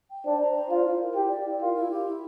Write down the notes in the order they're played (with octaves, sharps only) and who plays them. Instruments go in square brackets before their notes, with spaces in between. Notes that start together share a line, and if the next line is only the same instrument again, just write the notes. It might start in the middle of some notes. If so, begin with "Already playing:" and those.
[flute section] G5
[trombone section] D4 [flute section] C5
[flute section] A#5
C5
[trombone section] F4 [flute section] D5
[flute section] E4
A#4
[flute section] E4 [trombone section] G4
[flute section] D5
E4
[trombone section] F4 [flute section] A#4
[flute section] E4
G4
E4